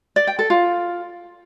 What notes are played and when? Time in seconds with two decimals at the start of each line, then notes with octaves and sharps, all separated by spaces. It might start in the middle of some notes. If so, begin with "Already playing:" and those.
0.16 D5
0.27 G5
0.39 A4
0.50 F4